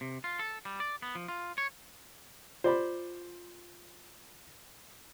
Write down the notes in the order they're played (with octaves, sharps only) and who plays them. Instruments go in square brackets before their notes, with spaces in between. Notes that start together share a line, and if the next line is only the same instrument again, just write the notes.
[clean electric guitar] C3
F4
A4
G3
D5
B3
F3
F4
C#5
[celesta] F4 [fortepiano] C5 D5 B5